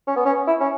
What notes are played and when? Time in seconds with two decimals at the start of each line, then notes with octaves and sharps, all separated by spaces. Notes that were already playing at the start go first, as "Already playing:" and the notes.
0.07 C#4
0.16 B3
0.26 C#4
0.47 E4
0.60 C#4